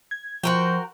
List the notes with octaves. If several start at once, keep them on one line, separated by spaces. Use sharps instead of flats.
G#6
F3 F#4 A#4 C5 G5 C#6